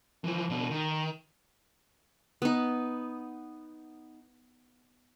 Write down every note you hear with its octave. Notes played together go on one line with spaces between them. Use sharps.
E3 F3
B2 D4
D#3
B3 D#4